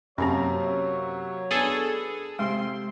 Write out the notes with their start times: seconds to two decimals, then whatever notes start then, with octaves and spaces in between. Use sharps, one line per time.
0.18 F#2 C3 F#3 A#3 C4 C#4 C#5 A#5
1.51 B3 D4 G#4 A4
2.39 C3 G#3 C4 C6